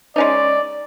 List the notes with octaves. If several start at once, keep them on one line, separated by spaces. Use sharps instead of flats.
G#3 C#4 D#4 D5